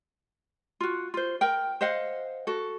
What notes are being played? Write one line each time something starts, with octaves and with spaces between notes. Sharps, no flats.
F4 F#4
F4 C5
A#4 G5
C5 D#5 F5 F#5
F#4 A4